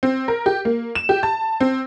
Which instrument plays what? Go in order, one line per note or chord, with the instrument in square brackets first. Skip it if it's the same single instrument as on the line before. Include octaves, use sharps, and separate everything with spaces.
[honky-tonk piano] C4
A#4
G4
A#3
E7
G4
A5
C4